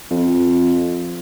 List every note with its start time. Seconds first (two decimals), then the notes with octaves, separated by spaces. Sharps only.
0.11 F2